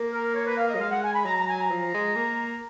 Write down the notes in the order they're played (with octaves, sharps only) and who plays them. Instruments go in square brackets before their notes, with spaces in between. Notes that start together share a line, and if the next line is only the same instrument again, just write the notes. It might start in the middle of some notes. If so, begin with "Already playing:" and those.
Already playing: [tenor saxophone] A#3
[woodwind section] A#4
C#5
B4
F5
D#5
[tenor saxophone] F#3
[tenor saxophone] G#3 [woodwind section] F5
[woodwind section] F#5
G#5
B5
[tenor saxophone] F#3 [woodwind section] A#5
[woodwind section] A#5
G#5
A#5
[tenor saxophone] F3
G#3
A#3